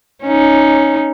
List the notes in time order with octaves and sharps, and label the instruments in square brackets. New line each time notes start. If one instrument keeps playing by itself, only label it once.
[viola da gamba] C#4 D#4